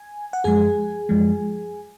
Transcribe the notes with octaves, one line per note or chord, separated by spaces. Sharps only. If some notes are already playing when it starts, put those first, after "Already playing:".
Already playing: G#5
F#5
F#2 F3 G#3 G#4 G#5
F#2 F3 G#3